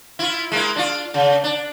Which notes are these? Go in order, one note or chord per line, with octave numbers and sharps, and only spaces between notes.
E4 F4
G#3 A#3 E4
D4 F4
C#3
D4